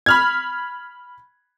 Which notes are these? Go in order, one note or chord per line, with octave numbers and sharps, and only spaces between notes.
B5 F6 G#6